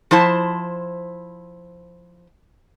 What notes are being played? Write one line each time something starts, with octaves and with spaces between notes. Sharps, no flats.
F3 E4 C5 A5